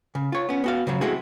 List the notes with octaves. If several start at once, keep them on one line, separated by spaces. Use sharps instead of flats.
C#3
F4 C#5
B3 C#4
B3 F#4 F5
C#3 F3 F#3
G#3 A3 C4 E4 F#4 G#4